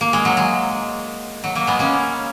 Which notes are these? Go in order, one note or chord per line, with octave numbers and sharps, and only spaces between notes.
A#3
G#3
F#3
G#3
F#3
F#3 A#3
G#3 B3
A#3 C#4